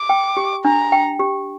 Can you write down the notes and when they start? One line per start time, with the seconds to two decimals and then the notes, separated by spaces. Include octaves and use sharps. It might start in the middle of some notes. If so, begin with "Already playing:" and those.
Already playing: D6
0.09 G5
0.37 G4
0.65 D4 A#5
0.92 G5
1.20 G4